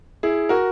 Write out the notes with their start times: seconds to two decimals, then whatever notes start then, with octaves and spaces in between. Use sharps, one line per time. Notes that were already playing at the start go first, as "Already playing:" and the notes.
0.23 E4 G#4
0.49 F#4 A#4